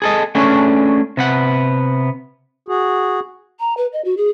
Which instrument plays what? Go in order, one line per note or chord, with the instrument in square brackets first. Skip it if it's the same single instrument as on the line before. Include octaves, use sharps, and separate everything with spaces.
[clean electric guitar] G#4 A4 D#5
A3 C#4 D4 G#4
C3 B3 F#5
[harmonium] F#4 G#4
[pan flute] A#5
B4
D#5
F#4
G#4